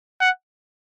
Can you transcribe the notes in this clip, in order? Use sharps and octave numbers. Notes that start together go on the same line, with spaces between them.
F#5